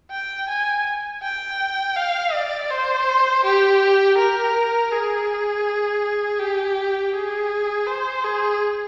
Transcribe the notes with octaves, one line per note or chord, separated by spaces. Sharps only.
G5
G#5
G5
F5
D5
C5
G4
A#4
G#4
G4
G#4
C5
G#4